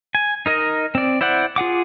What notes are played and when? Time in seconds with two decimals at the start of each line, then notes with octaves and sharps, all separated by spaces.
0.15 G#5
0.46 D#4 A#4 D#5
0.95 C4 D5
1.21 E4 C5 D5 F#5
1.56 F4 G#4 F#5 D6